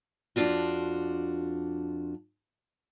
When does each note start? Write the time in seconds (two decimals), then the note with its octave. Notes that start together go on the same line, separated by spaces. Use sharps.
0.36 F2 D3 D4 F4 F#4